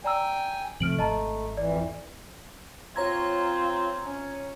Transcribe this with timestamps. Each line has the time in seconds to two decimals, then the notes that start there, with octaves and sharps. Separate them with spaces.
0.04 D5 G5 G#5 A#5 E6
0.80 C3 F3 A3 C4 F6 D7 F#7
0.99 G#1 D#5 A5 A#5
1.57 F2 E3 D5
2.96 C4 F4 C#5 A#5 G#6
4.04 C#4